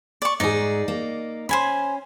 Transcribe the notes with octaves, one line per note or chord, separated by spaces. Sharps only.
D5 C#6
G#2 D#4 G#4 D5
A#3
C#4 C5 G#5 B5